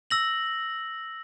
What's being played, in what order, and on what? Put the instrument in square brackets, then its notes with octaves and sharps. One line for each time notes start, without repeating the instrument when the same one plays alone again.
[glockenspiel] E6 A#6 F#7